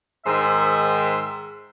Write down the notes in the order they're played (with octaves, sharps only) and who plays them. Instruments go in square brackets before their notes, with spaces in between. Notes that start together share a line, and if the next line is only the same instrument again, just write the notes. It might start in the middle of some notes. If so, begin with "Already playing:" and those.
[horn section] G#2 D#3 C5 E5